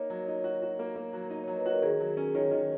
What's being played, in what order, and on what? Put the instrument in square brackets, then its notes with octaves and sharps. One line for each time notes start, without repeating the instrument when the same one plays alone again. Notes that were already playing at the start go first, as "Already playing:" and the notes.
Already playing: [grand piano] A#3 D#4 [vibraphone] C#5
[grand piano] F#3
D#4
F#4
F#4
A#3
A#3
F#3
[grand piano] D#4 [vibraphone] D#5
[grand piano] F#3 [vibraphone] C#5
[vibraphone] B4
[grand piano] F#4 [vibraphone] A#4
[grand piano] D#3 [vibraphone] G#4
[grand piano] F#3
C#4
[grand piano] D#3 [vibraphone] C#5
[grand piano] D#3